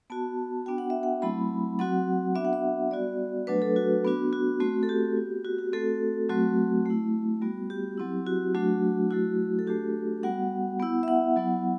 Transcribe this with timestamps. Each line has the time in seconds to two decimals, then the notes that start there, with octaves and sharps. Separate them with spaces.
0.10 B3 F#4 A5
0.66 B3 D4 F#4 G5
0.78 F#5
0.90 E5
1.03 F#5
1.22 F#3 A3 C4 E4 B5
1.79 F#3 C4 F#4 F#5
2.35 B3 D4 F#4 E5
2.45 F#5
2.53 E5
2.91 G3 B3 F#4 D5
3.47 F#3 A3 D4 B4
3.62 A4
3.76 F#4
4.05 B3 D4 F#4
4.33 F#4
4.60 A3 C4 F#4
4.83 A4
4.89 G4
5.16 B3 F#4
5.45 F#4
5.58 G4
5.73 A3 C4 F#4 A4
6.29 F#3 A3 C4 F#4
6.86 A3 E4
7.42 G3 B3 F#4
7.70 G4
7.98 F#3 C4 E4
8.27 F#4
8.55 F#3 A3 D4 F#4
9.11 F#3 A3 E4 F#4
9.59 A4
9.67 A3 D4 F#4 G4
10.23 G3 B3 F#4 F#5
10.80 B3 E4
11.03 E5
11.08 F#5
11.36 F#3 B3 E4